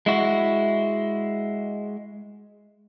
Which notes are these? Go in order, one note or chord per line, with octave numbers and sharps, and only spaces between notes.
G#3 E4 F#4